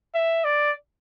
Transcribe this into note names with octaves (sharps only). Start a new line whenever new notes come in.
E5
D5